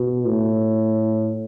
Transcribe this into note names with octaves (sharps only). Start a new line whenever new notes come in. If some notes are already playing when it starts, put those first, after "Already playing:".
Already playing: B2
A2